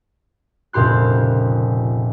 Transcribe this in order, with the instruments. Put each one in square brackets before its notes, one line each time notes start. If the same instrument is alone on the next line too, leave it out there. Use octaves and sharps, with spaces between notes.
[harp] F1 C#2 A#2 G4 C6 F#6